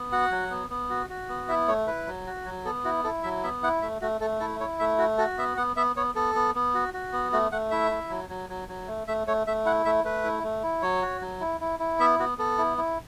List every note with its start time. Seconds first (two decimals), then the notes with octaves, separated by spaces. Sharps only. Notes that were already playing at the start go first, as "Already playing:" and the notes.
Already playing: B3
0.12 F#4 F#5
0.31 F#3
0.51 B3
0.70 B3
0.90 F#4
1.10 F#4
1.29 B3
1.48 E4 E5
1.68 A3 C#5
1.87 E4 B4
2.07 F#3
2.27 F#4
2.45 F#3
2.65 B3 A4
2.85 E4 F#4
3.04 E4 A4
3.23 F#3 E5
3.43 B3 E5
3.63 E4 F#5
3.82 A3 E5
4.01 A3 F#4
4.20 A3 A4
4.40 E4 A4
4.60 E4 C#5
4.79 A3 E5
4.99 F#4
5.18 F#4 A4
5.38 B3 E5
5.57 B3 F#5
5.76 B3 E5
5.96 B3 C#5
6.15 B3 A4
6.35 B3
6.55 B3
6.74 F#4
6.94 F#4
7.13 B3
7.32 A3 F#4
7.52 A3 F#5
7.71 E4 E5
7.91 E4
8.10 F#3
8.29 F#3
8.50 F#3
8.69 F#3
8.88 A3
9.07 A3 E5
9.27 A3 C#5
9.47 A3 E5
9.65 E4 F#5
9.85 A3 E5
10.04 A3 B4
10.24 E4
10.43 A3
10.63 E4
10.82 F#3 C#5
11.02 F#4
11.22 F#3
11.41 E4
11.61 E4
11.79 E4
11.99 B3 E5
12.19 B3 F#4
12.38 B3 A4
12.58 E4
12.78 E4